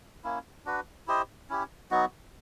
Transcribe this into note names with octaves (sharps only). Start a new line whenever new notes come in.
A#3 C#4 E4
D4 F#4 B4
E4 G4 C5 D#5
C#4 E4 G4
F#3 B3 D#4 F#4